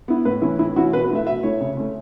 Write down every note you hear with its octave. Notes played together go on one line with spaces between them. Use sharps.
B3 E4
A2 B4
E3 C#4 E4
A2 E4
E3 C#4 E4 F#4
B2 B4
B4
A3 E4 E5
B2 E5
A3 E4 C#5
C#3
A3 C#4